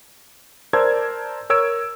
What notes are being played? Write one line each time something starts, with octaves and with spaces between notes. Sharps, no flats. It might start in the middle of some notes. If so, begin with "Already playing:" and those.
A#4 C5 D5 A5 E6 G#6
A#4 C#5 E6 G#6 D7